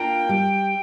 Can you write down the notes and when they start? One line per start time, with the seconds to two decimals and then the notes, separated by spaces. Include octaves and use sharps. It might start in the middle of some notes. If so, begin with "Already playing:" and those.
Already playing: A#3 D4 F4 A#4 G5
0.29 G3